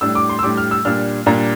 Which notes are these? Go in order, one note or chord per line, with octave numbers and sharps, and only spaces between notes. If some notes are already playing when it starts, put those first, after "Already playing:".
A2 G3 D4 E6
D6
C6
E6
A2 G3 D4 D6
F6
E6
A#2 G3 D4 F6
A#2 G3 D4 A#5